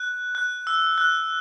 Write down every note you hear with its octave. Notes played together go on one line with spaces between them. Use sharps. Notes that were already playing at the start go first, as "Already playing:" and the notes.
Already playing: F#6
F#6
E6
F#6